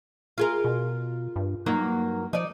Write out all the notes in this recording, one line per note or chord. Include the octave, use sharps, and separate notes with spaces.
F4 G#4 A#4
B2
G2
G2 F#3 A#3 D#4
F3 D#4 D5